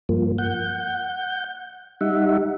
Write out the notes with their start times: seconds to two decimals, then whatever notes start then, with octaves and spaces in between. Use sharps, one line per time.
0.09 G2 F3 A#3
0.38 F#5 G6
2.01 G3 D#4 E5 F#5